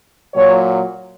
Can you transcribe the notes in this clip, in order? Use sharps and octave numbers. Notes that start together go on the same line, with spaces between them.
A#2 F#3 C#5